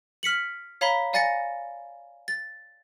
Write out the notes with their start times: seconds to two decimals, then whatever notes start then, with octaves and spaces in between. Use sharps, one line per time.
0.23 F6 B6 C#7 F#7
0.81 C#5 F5 A#5 B5 B6 G7
1.13 D5 F5 G#5 A6 A#6 C#7
2.28 A6